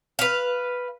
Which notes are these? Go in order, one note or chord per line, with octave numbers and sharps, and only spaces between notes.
B4 F5